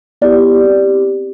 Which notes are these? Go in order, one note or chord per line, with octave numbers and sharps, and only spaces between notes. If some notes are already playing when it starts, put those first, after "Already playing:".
B3 E4 G4 D5
C4 G4